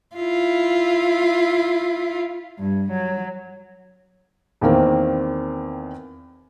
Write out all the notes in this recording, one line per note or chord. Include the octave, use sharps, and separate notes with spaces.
E4 F4
G2
F#3
E2 D#3 A#3 C4